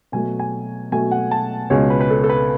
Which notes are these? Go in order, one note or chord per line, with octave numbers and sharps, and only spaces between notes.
B2 F#3 A3 G#5
G#5
B2 F#3 A3 G#5
F#5
A5
C#2 B2 G#3 C#4 C#5
B4
B4
A4
A4
B4